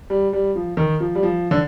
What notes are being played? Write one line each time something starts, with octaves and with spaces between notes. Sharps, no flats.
G3
G3
F3
D#3
F3
G3
F3
D3